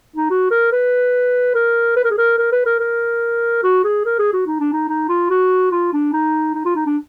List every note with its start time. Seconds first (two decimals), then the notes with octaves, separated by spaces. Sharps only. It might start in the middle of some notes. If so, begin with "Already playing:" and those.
0.16 D#4
0.30 F#4
0.51 A#4
0.72 B4
1.55 A#4
1.96 B4
2.04 A#4
2.10 G#4
2.18 A#4
2.38 A#4
2.52 B4
2.66 A#4
2.80 A#4
3.63 F#4
3.84 G#4
4.05 A#4
4.19 G#4
4.33 F#4
4.47 D#4
4.60 D4
4.73 D#4
4.88 D#4
5.09 F4
5.30 F#4
5.72 F4
5.93 D4
6.13 D#4
6.55 D#4
6.65 F4
6.76 D#4
6.86 D4